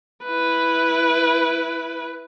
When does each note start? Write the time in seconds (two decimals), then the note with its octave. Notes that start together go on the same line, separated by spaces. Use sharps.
0.25 E4 B4